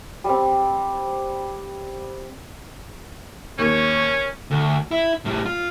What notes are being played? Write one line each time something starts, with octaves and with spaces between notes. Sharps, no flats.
G3 C4
D#2 C#4
D2
E4
A2 G3
F4